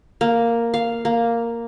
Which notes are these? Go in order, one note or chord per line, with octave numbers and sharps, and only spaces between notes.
A#3
F5
A#3